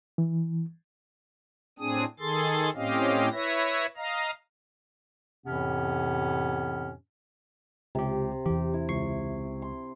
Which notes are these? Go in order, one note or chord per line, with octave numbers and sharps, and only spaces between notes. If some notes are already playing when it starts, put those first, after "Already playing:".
E3
A2 C4 D4 G#4 D#6
D#3 G#4 A4 C6 A6
A2 C4 C#4 G4 D#5 F5
E4 B4 C#5 E5 A#6
D#5 F5 A#5
F2 A2 C3 E3 B3 C#4
C#2 C3 G4
E2 E3 G4
E4
C#2 C#6 C7
C6